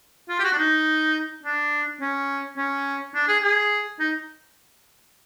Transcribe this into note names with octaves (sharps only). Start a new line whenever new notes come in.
F4
G4
F#4
D4
D#4
D4
C#4
C#4
D4
G#4
G#4
D#4